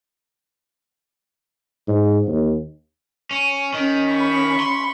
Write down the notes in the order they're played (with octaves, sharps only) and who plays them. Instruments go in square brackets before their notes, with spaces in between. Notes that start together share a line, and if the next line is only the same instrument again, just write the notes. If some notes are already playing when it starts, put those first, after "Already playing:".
[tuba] G#2
D#2
[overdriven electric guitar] C#4
[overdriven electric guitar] D#3 [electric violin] C#4 B6
[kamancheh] B5 C#6
[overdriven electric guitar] C6